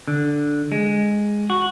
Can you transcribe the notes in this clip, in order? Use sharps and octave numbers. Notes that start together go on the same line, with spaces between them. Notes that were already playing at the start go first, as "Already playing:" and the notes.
D3
G#3
F#4